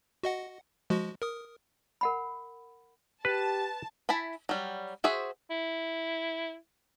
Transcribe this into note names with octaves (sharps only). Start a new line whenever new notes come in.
F#4 D#5 F#5
F3 G#3 F#4
A#4 D#6
A#4 F#5 B5
G4 B4 A5
E4 G#5 A5 B5
F#3 G3
F#4 G#4 C5 E5
E4